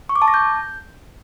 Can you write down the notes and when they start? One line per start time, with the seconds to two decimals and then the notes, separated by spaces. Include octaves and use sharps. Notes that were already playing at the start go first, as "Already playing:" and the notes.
0.09 C#6
0.16 D6
0.22 A5
0.28 A#6
0.34 G6